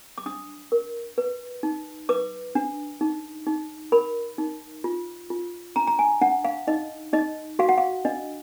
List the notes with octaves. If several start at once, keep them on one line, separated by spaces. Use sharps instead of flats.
D6
D4 D#6
A#4
B4
D#4
B4 D6
D4
D#4
D#4
A#4 B5
D#4
F4
F4
D4 A#5
A#5
G#5
D4 F#5
F5
D#4 D#5
D#4 D#5
F#4 F5
F#5
F5
D4 D#5